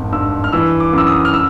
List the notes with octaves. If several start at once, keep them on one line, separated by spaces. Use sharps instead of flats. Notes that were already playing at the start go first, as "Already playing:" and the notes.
Already playing: G#1 F2
G2 E6
F6
E3 E6
D6
F#2 E6
D#6
F6
E6